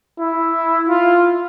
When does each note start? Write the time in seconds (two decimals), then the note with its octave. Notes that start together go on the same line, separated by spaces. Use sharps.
0.19 E4
0.89 F4